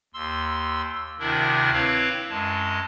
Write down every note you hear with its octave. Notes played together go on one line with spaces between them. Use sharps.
D#2 C6 E6
D2 C3 D#3 D4 E4 A#4
C4 E4 B4 C#5 F5
F#2 G#3 A5